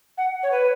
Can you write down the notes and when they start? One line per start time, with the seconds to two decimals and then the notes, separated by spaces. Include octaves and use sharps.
0.18 F#5
0.43 C#5
0.51 B4